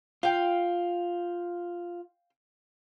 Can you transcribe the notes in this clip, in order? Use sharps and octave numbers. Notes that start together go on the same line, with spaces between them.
F4 F5 G5